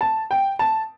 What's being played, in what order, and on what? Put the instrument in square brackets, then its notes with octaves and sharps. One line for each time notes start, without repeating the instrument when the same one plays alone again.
[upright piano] A5
G5
A5